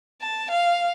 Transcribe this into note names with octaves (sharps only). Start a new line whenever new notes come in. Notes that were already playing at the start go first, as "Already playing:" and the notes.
A5
F5